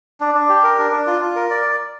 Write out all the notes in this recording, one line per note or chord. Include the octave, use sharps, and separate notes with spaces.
D4
D4
G4
A#4
D4
D4
F4
F4
A#4
D5